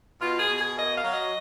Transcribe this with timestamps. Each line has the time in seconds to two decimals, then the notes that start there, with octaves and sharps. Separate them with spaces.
0.21 B2 F4
0.39 G#4
0.48 B2
0.57 G#4
0.76 A#3 D#5
0.95 F5
1.03 F#3
1.12 D#5